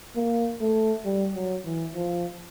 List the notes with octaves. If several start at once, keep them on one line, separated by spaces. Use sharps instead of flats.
A#3
A3
G3
F#3
E3
F3